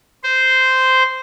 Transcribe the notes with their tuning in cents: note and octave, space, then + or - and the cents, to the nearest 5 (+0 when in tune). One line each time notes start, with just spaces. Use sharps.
C5 -10